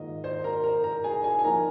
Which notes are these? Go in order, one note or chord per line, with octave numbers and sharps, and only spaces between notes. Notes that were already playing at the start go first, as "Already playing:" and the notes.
Already playing: G#2 D#3 A#3 F4 D#5
C5 C6
A#4 A#5
A#4 A#5
A#4 A#5
G#4 G#5
G#4 G#5
G#5
F3 A#3 D#4 A#4 A#5